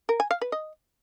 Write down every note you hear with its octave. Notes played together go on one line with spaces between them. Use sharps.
A#4
G#5
F5
B4
D#5